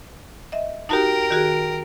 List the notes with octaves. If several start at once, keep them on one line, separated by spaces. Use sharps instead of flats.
D#5 E5
D#4 F#4 G4 A#4 G5
D#3 F#4 G#4